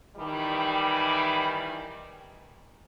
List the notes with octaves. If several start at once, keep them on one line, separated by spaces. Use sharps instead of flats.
D#3 E3 G3